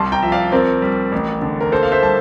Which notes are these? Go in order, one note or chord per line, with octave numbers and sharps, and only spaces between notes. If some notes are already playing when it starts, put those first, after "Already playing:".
Already playing: C2 G3 A5 C6
G5 A#5
F3 E5
D5 F5
C4 A#4 D5
G3
A1
D3
A#4
A#3 A4 C5
F5
C5 E5
G3 A5